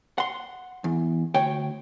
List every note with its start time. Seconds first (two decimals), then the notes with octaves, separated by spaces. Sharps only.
0.18 F#5 C6
0.84 E2
1.34 D2 C#5 G5